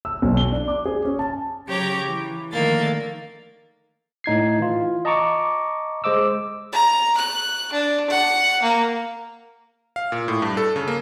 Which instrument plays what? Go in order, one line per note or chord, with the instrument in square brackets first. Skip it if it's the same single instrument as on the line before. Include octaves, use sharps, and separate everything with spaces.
[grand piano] E6
B1
G7
D4
D6
G#4
C#4
A5
[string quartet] C#3 F#3 G4 C#5 A#5 D6
E3
D3 D#3 F3 A3 A#3 A6
[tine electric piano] A2 D#4 G#6 C7
E3 F4
D#5 A5 A#5 C#6 D6
G#3 C5 D#5 D6 E6
[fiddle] A#5
F#6
D4
F#5
A#3
[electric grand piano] F5
A#2
A2
G2
A4
C#3
A#3